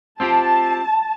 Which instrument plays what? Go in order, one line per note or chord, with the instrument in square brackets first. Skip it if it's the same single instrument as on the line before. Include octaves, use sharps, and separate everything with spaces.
[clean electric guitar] C4 F4 G4 [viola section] A5